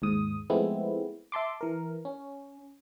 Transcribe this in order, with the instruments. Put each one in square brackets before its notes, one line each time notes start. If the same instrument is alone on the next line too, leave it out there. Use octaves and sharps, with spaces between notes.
[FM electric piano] D#2 G#2 D#6
F3 G#3 A3 B3 C4 E4
E5 A5 C6 D6
E3 A#4
C#4